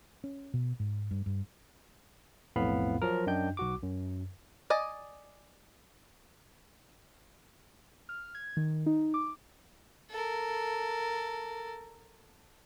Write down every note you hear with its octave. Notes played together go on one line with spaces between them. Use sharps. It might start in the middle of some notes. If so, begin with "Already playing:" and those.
C#4
B2
G#2
G2
G2
B1 F2 A2 B3 F5 B5
F3 F#3 A#4
F#2 D4 D#5 G5 G6
B1 F#4 D6
F#2
D5 D#5 G#5
F6
G#6
D#3
D#4
D6
A4 A#4